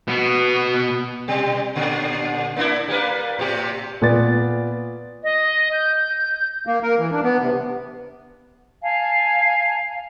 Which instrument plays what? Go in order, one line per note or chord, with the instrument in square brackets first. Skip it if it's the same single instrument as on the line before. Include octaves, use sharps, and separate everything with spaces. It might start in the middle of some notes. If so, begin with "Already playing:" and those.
[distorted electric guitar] B2 B3
[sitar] B2 G3
A#2 D3
A#3 D4 E4
G3 A#3 B4
A2 C3 G4
[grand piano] A#2 B3 D5 A6
[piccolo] D#5
G6
[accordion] A#3
A#4
E3
D4
B3
C3
[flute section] F5 G#5 A5